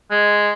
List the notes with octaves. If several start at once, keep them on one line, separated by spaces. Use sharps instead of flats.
G#3